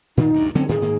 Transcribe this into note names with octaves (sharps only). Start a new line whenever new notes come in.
A#2 D#3 D#4
D2 G2
D3 F#3 C4 C#4
A2 D3 D#3 G#4
G#2 D#3 A#3